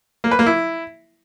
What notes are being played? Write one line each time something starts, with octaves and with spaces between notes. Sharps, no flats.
A#3
B4
A#3
E4